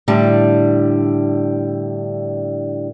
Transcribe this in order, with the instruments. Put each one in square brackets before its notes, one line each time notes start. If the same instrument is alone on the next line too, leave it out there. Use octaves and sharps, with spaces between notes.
[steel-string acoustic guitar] A2 D3 G3